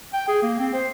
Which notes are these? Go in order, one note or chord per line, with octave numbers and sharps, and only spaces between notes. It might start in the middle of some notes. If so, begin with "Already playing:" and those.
G5
G#4
A#3
C4
C5